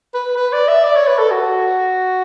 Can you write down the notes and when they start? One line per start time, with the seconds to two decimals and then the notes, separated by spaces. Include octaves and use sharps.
0.14 B4
0.37 B4
0.53 D5
0.68 E5
0.84 D5
0.96 C#5
1.07 B4
1.19 A4
1.31 F#4